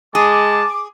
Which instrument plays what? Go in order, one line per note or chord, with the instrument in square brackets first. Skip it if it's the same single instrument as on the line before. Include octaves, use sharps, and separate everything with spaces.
[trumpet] G#3 [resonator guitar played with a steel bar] G#4 [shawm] A5 [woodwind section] D6